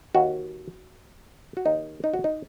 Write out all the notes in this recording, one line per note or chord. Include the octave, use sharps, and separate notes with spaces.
D#2 D#3 F#4
F#4
D#2 D#3 D#4
D#4
F#4
D#4